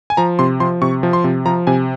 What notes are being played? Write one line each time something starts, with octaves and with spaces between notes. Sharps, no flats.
G#5
F3 A#5
C3 C6
F3 C6
C3 C#6
F3
C6
C3
F3 A#5
C3 G#5